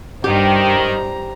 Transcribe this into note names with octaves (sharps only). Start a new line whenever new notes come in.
G2 D#3 G4 C5 A#5